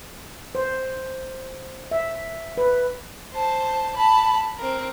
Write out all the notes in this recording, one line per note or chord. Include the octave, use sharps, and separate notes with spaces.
C5
E5
B4
C5 A5
A5 B5
C4 A#4